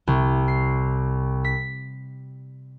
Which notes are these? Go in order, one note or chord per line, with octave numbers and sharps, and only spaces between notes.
C2
C7
B6